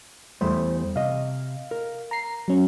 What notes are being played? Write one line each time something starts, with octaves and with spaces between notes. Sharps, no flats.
E2 G3 A3 C5
C3 D#5 F5
A#4
A#5 C7
F#3 C#4